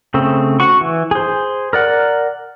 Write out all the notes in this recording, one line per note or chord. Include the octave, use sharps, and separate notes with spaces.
C#3 A3 C4
F#4 C#6
E3
G#4 C5
A#4 D5 F#5